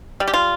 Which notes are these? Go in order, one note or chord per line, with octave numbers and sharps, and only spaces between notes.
G3
G4
F4